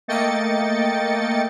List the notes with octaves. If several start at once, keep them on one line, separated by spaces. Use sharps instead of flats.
A3 A#3 D#5 G5 A6 C#7